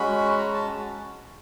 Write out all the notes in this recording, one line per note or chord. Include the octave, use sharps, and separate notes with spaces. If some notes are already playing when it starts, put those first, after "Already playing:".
Already playing: G#3 C#4 F#4 B5
A#5
A5